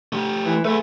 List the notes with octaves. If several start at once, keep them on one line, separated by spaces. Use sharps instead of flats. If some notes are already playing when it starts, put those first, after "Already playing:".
A3 G4
E3
A3 G#4 B4